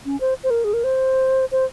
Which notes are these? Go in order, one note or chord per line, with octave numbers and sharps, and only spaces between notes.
C#4
C5
C5
A#4
G#4
A#4
C5
C5